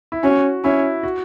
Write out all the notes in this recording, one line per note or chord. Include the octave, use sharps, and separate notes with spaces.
E4
C#4 F#4
C#4 E4
F#4